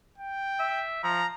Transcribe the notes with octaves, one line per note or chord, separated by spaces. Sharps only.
G5
E5
F3 A#5